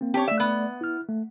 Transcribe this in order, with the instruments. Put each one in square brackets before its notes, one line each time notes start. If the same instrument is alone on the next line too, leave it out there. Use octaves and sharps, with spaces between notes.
[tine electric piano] A#3 C4
[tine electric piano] C4 A5 [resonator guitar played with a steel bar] G4 C#5
[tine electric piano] A3 D5 [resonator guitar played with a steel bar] E5
[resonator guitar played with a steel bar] B3
[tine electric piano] E4 F6
A3